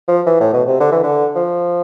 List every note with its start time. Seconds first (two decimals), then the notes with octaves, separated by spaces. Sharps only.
0.08 F3
0.27 E3
0.41 A2
0.53 B2
0.68 C3
0.80 D3
0.92 E3
1.03 D3
1.36 F3